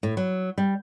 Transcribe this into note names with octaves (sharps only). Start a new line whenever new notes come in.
A2
F#3
G3